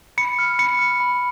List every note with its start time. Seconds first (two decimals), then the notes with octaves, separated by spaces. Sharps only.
0.18 B5 C#7
0.39 F6
0.59 B5 C#7
0.79 F6
1.00 B5